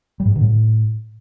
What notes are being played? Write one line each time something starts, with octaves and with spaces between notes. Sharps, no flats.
G3
G#2
G3
D3
A2